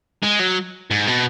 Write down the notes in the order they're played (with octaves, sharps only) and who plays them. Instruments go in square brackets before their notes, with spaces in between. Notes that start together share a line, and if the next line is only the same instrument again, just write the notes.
[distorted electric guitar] G#3
F#3
G#2
B2